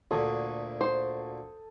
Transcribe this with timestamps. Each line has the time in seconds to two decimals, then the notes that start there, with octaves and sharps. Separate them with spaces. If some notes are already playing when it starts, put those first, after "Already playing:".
0.11 D2 A#2 A4 G#5 D#6
0.81 C5